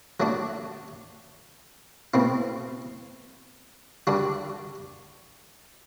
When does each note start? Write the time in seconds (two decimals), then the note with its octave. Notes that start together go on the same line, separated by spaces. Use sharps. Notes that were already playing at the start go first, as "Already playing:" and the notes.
0.20 F#3 A3 D4 F#4
2.14 B2 A3 C4 E4
4.07 D3 G3 D4 F#4